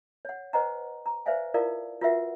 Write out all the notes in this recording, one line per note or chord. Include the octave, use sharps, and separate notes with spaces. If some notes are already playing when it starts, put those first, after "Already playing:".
C#5 F#5
B4 C5 D#5 F#5 G#5 A#5
A#5
B4 C5 D5 E5 F5 G#5
E4 F4 A4 A#4 D5 F5
F4 F#4 A#4 B4 E5 F#5